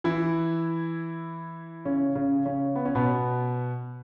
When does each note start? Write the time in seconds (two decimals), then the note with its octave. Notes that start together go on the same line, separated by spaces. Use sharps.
0.04 E3 E4
1.85 C#3 C#4
2.15 C#3 C#4
2.45 C#3 C#4
2.75 B3
2.85 C#4
2.95 B2 B3